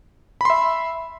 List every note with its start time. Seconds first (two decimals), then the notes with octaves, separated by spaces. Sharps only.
0.41 B5
0.45 C6
0.50 E5